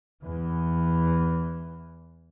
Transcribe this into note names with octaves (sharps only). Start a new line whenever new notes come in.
E2 E3